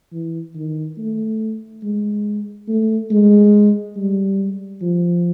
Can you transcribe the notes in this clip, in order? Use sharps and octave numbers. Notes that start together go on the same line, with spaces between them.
E3
D#3
A3
G#3
A3
G#3
G3
F3